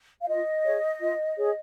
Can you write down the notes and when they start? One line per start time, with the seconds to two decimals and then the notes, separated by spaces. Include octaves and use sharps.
0.22 F5
0.27 F4 D#5
0.64 G#4 C#5
1.00 F4
1.37 G#4 C#5